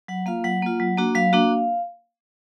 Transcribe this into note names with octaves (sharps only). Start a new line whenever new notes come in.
F#3 F#5
A#3 F4 F5
F#3 F#5
A#3 F4
F#3
A#3 D4 F#4
F#3 F5
A#3 D4 F#4